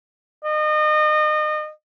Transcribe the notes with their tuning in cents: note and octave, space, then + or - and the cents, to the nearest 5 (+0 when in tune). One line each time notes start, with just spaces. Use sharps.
D#5 -30